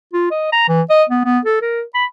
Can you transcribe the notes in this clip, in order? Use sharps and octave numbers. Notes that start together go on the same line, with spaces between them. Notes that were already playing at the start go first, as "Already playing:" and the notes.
F4
D#5
A#5
E3
D#5
B3
B3
A4
A#4
B5